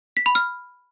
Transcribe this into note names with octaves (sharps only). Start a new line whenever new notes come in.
B6
B5
F6